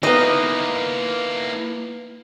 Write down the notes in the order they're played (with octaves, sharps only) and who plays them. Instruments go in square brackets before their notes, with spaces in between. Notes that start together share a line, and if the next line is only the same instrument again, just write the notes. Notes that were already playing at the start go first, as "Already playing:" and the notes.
[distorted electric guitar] A#3 E4 [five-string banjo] B3 D#4 [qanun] D#5